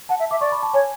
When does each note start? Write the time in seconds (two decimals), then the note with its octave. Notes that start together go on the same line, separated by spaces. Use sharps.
0.09 F#5 A5
0.20 E5
0.31 E5 D6
0.41 D5 C#6
0.52 B5
0.63 A5
0.74 C#5 G#5